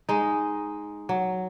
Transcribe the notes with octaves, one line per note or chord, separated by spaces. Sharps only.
G#3 D#4
F#3